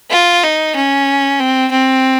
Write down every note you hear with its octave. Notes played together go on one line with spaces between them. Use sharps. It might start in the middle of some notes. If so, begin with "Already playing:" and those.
F4
D#4
C#4
C4
C4